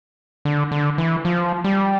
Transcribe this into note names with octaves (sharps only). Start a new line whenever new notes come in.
D3
D3
E3
F3
G3